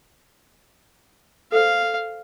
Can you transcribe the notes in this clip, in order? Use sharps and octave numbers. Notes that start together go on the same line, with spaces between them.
A4 C5 F5